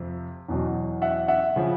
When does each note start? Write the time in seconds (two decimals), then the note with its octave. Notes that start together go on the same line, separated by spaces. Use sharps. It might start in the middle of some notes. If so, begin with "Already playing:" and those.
Already playing: F2 C3 F3
0.48 E2 B2 F#3
1.02 E5 F#5
1.28 E5 F#5
1.56 C#3 F3